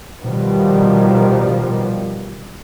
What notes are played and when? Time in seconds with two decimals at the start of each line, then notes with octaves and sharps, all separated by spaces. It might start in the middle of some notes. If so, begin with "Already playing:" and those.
0.22 B2 D#3 F3 G3